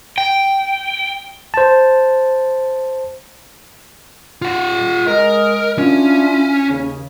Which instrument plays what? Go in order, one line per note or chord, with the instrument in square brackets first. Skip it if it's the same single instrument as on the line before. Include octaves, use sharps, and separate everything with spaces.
[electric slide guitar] G5
[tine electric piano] C5 A5
[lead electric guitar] F4 F#5
[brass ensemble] G#3 D#5 [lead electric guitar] A#4
[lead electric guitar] C#4 [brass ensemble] D4 E4 F4
[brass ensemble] D#2 C#3